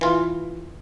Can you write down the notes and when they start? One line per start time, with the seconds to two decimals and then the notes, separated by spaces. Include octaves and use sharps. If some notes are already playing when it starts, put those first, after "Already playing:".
0.01 E3 F4